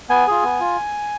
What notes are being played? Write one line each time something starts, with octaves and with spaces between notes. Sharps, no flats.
B3 G#5
F4 G#4
B3
F4